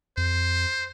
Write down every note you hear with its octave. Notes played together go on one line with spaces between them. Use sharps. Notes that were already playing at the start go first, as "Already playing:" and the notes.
F2 C5